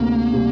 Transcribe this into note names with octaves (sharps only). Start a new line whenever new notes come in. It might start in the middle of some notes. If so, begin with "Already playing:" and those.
Already playing: D2 C3 A#3 C4
C3 G3